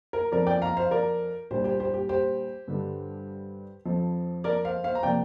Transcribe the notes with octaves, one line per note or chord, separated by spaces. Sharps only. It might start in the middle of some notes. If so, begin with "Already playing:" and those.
A#4
F2 F3 C4 A#4 D5
D5 G5
F5 A#5
C5 F5
A#4 D5
A#2 G3 D4 G4 C5
G4 C5
G4 C5
G4
G4 C5
G2 D3 G3 D4
F2 F3 C4
A#4 D5
C5 F5
C5 F5
A#5
C3 F3 A#3 D5 G5